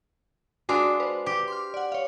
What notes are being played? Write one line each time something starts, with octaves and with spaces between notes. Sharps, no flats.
G#3 D4 F4 F#4
B4 C5
G4
C6 D6 F6
D5 F#5
C#5 F5